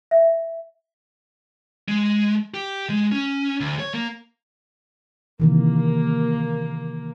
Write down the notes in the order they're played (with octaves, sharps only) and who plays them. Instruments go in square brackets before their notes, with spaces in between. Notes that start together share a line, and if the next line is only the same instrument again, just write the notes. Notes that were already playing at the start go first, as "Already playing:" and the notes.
[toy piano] E5
[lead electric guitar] G#3
G4
G#3
C#4
D2
C#5
A#3
[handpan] C3 D#3 E3 [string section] A#3